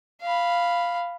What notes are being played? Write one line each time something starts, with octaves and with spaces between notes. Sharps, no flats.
F5 B5